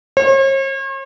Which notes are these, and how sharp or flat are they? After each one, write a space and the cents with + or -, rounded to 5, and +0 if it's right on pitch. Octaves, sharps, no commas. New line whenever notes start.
C#5 -45